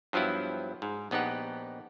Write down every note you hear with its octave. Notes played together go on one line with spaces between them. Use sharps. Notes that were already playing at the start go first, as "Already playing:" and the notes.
G2 F3 F#3 B3 E4
G#2
A#1 B3 D#4 G4 F#5